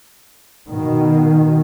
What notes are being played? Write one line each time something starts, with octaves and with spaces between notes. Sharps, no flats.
B2 D#3